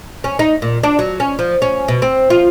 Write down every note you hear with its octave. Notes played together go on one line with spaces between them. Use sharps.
C#4
D#4
A#2
D4
F#3
C#4
F3
C#4
B2
C4
F4